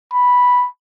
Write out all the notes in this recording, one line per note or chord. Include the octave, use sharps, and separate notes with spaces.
B5